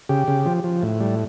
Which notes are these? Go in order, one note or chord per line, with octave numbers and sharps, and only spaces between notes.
C#3 G4
C#3
F3
F3
A2
G3